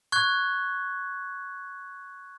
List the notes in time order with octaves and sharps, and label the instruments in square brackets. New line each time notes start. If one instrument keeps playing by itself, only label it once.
[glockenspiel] C#6 F#6 G#6